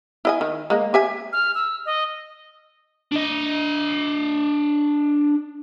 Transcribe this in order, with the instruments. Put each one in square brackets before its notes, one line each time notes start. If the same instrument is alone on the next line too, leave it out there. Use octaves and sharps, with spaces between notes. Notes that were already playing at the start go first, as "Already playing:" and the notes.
[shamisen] E4 D#5 G#5
D#3
G#3 A#3
G4 E5 G#5
[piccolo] F6
E6
D#5
[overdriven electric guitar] D4 D#5